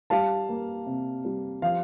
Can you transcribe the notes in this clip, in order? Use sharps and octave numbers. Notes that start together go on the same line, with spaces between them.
G3 F5 A5
A#3
C3
G3
F3 F5